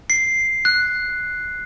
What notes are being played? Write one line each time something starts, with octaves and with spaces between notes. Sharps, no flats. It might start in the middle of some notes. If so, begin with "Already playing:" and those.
C7
F#6